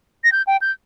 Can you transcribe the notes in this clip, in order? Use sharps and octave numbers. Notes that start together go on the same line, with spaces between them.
A#6
G6
G5
G6